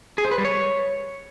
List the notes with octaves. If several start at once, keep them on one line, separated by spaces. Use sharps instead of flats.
G#4
C5
B4
G3
C#5